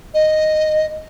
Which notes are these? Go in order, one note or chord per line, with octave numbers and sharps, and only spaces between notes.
D#5